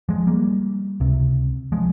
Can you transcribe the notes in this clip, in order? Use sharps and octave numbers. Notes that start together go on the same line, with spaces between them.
F3 G#3
G3 A#3
C#2 C3
F3 G#3